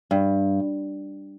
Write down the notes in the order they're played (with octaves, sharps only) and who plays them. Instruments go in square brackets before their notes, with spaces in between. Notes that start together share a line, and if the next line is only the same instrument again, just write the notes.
[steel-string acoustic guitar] G2